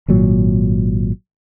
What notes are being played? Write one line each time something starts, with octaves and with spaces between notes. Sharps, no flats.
G#1 A#2 F#3